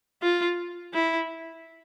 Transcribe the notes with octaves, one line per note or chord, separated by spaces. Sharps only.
F4
E4